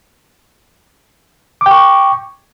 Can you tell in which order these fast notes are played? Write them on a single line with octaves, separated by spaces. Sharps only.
D6 G5 C#6